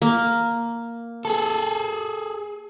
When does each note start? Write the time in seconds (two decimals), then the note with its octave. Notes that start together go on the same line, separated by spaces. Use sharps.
0.02 A#3
1.25 G#4 A4